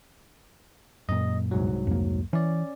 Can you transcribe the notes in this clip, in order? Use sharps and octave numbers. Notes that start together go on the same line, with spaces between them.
F#2 A#2 D#5
C2 G#2 F#3
F2 A#3
E3 C#4 D5